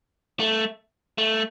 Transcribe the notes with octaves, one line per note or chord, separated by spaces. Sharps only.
A3
A3